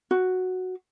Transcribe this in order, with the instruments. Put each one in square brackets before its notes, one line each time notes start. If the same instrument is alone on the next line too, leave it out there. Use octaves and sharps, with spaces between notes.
[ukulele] F#4